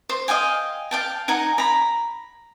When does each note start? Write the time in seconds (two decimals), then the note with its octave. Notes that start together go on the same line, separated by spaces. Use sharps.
0.09 C5
0.28 D#5 F5 G5 G#5
0.91 F5 G5 A5
1.28 D#4 F#5 G#5 A#5
1.58 A#5 B5